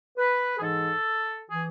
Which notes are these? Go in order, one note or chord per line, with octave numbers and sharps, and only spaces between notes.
B4
G#4
G#2 E3 A4
E3 G#4